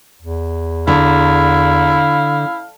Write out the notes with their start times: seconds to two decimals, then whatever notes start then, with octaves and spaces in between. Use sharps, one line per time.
0.22 E2
0.88 D3 E4 F5